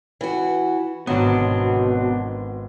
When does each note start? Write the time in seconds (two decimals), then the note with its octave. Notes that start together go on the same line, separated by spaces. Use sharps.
0.21 E3 F#4
1.07 G#1 B2 F#3 B3 C4 D4 C5